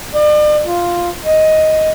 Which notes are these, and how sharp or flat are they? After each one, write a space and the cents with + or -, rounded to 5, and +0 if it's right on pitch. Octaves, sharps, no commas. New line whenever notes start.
D5 +40
F4 +0
D#5 +5